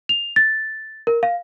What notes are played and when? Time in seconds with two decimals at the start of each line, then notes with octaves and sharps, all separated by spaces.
0.09 F7
0.36 A6
1.07 A#4
1.23 F5